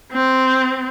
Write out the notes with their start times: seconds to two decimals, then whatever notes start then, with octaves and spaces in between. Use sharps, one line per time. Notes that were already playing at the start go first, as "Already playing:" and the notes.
0.12 C4